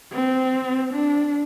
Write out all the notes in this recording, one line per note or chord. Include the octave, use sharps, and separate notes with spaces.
C4
D4